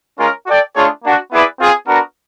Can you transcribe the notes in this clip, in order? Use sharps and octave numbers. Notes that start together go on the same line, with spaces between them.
G#3 C#4 F4 A#4
F#4 A4 D5 G5
A3 D4 F4 G#4 C#5
A#3 D4 F#4
B3 E4 G#4 B4 D5
C4 F4 G#4
B3 D4 F#4 A#4